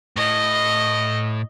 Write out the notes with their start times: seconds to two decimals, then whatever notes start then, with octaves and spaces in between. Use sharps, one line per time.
0.17 A2 D#5